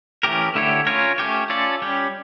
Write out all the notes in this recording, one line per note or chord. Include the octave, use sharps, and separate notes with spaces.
E3 A3 C#4 G4 A#4
D3 A3 E4 G4 C#5
C#4 F4 A#4 C#5
A3 C#4 G4 C#5
C#4 F4 A4 D5
G3 C#4 G4